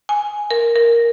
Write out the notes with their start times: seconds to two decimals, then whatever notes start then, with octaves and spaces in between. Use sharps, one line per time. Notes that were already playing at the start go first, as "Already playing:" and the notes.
0.09 G#5
0.50 A#4
0.76 A#4